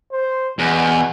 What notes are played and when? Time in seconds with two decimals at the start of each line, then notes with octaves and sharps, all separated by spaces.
0.12 C5
0.59 E2 B2